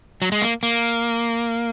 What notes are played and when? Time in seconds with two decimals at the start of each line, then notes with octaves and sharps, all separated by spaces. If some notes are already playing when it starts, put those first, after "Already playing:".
0.22 F#3
0.32 G#3
0.42 A#3
0.63 A#3